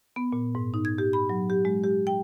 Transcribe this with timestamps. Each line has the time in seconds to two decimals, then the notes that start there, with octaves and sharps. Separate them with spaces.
0.16 B3
0.33 A#2
0.55 G#2
0.74 D#4
0.85 G#6
0.98 G4
1.13 B5
1.30 F#3
1.50 G4
1.65 G#3
1.84 G4
2.07 G5